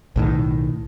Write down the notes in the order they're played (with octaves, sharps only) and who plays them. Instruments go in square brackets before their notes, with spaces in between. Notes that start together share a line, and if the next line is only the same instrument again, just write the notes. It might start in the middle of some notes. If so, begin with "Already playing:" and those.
[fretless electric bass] B1 A2 D#3